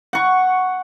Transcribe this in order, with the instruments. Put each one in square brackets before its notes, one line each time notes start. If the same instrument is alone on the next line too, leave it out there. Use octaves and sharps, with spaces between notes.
[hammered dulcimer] F#5 C#6